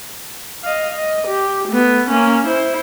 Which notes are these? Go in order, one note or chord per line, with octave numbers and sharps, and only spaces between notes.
D#5 F5
D#5
G4
A3 B3
A#3 C#4
E4 C5